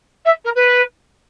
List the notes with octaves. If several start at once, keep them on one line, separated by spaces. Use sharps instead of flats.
E5
A#4
B4